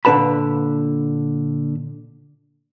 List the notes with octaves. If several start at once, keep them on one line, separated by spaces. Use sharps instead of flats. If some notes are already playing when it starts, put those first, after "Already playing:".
A#2 D3 D4 B4 A5 B5